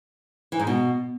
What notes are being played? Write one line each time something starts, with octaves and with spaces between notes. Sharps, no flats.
E3
G#2
B2